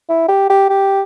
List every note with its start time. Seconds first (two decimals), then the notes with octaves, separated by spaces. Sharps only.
0.09 E4
0.29 G4
0.50 G4
0.70 G4